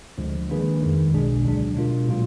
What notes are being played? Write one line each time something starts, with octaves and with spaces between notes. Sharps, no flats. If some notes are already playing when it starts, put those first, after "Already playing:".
D2 D3 F3 G#3
D#3 A#3 D4 G#4 B4
F2 D#3 G#3
B1 B2 G#3 D4 G#4
D2 D3 F#3 D4
B2 G#3 D4 F4 A#4
A#2 F#3 A#3 F4